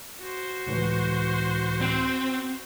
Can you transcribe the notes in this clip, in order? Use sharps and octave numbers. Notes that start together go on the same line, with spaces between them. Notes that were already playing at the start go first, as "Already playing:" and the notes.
F#4 C5
C#2 A2 E3
C4